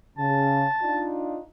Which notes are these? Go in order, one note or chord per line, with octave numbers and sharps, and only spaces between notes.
C#3 A5
D4 D#4 F4